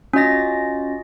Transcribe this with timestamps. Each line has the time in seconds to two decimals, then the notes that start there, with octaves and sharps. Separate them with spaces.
0.13 C#4 F4 F#4 D#5 A6 A#6